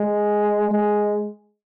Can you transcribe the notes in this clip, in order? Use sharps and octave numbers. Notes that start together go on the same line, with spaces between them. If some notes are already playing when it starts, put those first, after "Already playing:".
Already playing: G#3
G#3